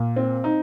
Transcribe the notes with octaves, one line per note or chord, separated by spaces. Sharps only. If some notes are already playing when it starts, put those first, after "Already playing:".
Already playing: A#2
C4
D#4